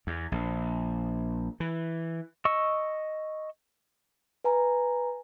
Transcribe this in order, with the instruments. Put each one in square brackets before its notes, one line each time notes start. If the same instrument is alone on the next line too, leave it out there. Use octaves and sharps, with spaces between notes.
[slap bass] E2
A#1
E3
[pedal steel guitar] D#5 C#6 E6
[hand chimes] B4 G#5 A#5